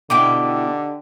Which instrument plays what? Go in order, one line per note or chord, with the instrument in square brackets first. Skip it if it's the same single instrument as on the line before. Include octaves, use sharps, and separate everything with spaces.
[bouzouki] B2 E4 E5 [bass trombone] D3 [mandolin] D#4 G4 [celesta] D6